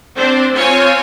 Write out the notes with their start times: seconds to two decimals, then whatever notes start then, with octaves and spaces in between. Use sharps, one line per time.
0.16 C4 D4 C5
0.54 C4 F4 C#5 G#5